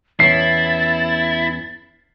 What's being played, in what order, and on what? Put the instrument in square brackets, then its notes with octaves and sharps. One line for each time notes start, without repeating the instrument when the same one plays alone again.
[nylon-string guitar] E2 B3 C#4 [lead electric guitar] E4 [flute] A6 [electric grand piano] C7